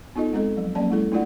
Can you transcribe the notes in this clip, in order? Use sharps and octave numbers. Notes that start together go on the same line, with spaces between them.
B3 D#4 F4 A4 D#5
G#3 C4 A4 D#5
F3 F#3
F3 F#3 A#3 C#4 D5 A5
G#3 E4 A4
A3 D4 E4 F4 D5 F#5